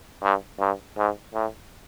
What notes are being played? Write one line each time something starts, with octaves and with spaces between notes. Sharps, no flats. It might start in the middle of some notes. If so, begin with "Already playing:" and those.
G2
G2
G#2
A2